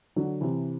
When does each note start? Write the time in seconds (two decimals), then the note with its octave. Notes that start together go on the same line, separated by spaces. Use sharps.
0.16 D3 F#3
0.41 C3 E3